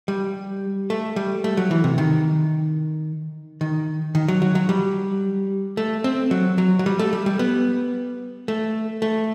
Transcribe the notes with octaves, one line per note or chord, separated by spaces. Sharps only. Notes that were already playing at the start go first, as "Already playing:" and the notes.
G3
A3
G3
A3
F#3
E3
C3
D#3
D#3
D#3
F#3
F#3
F#3
G3
A3
C4
F#3
F#3
F#3
G3
A3
G3
G3
B3
A3
A3